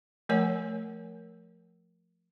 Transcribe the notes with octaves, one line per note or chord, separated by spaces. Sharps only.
F3 A3 A#4 C#5 G#5